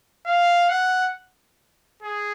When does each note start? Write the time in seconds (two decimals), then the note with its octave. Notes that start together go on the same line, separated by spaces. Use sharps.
0.26 F5
0.70 F#5
2.03 G#4